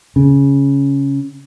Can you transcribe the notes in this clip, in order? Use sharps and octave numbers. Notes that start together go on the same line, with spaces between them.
C#3